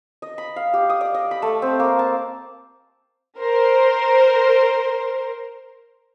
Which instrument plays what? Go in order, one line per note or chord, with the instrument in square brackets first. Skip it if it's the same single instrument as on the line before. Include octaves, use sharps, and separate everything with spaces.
[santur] D#5
B5
F5
G4
D#6
D5
D#5
B5
A3
C4
A#3
A5
[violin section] A#4 C5